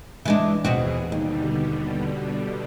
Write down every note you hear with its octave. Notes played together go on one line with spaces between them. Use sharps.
E3 G#3 D4
D#2 B2 E3 C4 F#4 G#4
D#2 B2 D3 G3